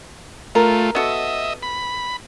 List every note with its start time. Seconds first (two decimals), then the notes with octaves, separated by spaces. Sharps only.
0.55 A3 F4 A#4
0.95 B3 F#4 A4 D#5 E5
1.63 B5